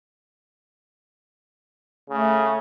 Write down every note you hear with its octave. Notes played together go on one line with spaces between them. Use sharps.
C#3 A3